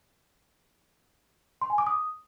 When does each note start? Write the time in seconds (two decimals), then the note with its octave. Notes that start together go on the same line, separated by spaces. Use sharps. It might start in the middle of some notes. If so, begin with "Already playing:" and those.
1.62 C6
1.70 G#5
1.78 D6
1.87 D#6